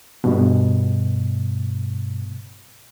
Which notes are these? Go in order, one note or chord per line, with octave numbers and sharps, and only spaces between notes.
G2 B2